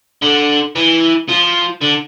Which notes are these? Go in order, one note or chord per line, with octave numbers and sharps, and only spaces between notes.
D3
E3
F3
D3